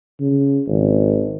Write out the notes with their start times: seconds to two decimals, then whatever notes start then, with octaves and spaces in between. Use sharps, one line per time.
0.20 C#3
0.67 G#1